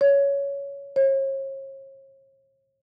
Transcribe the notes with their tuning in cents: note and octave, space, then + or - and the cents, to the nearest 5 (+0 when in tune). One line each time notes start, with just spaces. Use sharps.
C#5 +15
C#5 -40